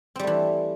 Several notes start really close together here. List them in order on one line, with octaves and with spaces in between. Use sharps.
C4 G3 A3 E3